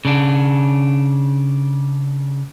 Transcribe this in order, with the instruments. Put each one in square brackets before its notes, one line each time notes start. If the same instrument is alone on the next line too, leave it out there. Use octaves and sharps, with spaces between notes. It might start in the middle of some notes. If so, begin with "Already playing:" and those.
[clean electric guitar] C#3 D4